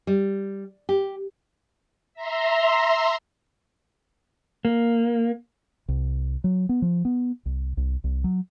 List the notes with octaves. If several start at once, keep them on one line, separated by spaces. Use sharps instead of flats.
G3
G4
E5 A#5 C6
A#3
C2
F#3
B3
F3
B3
C2
C2
C2
F#3